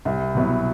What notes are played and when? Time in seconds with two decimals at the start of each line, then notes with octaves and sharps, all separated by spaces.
0.05 C2
0.35 B2 F#3 B3 E4